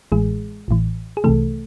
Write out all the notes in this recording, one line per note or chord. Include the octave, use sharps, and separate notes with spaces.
A1 A2 E3 G#3 G#4
A1 A2 E3
G#4
C2 C3 E3 A3 A4